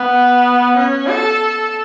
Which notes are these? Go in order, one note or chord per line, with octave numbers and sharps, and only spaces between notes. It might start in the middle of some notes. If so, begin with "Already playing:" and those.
Already playing: B3
C#4
A4